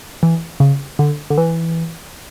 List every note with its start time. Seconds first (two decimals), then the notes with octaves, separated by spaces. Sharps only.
0.23 E3
0.60 C#3
0.99 D3
1.30 D3
1.38 E3